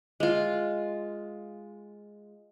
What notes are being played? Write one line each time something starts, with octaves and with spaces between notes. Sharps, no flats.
G#3 F4